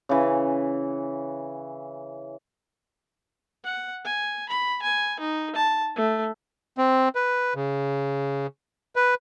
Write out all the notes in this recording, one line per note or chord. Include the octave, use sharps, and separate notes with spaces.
C#3 E3
F#5
G#5
B5
G#5
D#4
A5
A3
C4
B4
C#3
B4